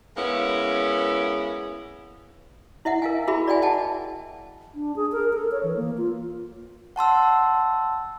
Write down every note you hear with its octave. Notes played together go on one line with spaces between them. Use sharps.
G#3 A#3 B3 C#4 E4
E4 D#5 E5 F#5
A#4 F5 G#5
E4 F#4 G#4 A#4 E5 B5
D5 D#5 G5 G#5
D#5 F#5 G5 A5
D4
G#4
A#4
A4
C#5
E3
A#3
F4
F#5 A5 C6 E6